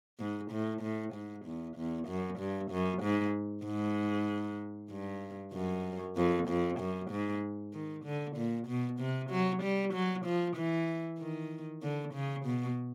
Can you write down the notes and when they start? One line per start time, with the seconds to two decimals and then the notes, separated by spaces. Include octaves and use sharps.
0.19 G#2
0.51 A2
0.82 A2
1.14 G#2
1.46 E2
1.77 E2
2.08 F#2
2.39 G2
2.71 F#2
3.02 G#2
3.65 G#2
4.90 G2
5.53 F#2
6.17 F2
6.48 F2
6.79 F#2
7.11 G#2
7.74 D#3
8.05 D3
8.37 A#2
8.67 B2
9.00 C3
9.30 F#3
9.63 G3
9.94 F#3
10.25 F3
10.57 E3
11.19 D#3
11.82 D3
12.14 C#3
12.45 B2